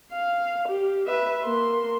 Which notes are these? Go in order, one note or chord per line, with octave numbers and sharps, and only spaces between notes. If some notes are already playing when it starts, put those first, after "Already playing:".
F5
G4
B4 E5
A#3 C6